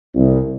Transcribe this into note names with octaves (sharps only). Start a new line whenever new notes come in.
C2